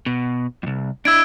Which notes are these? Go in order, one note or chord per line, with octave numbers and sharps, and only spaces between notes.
B2
C2 F2
D4 E4 E6 G#6 D7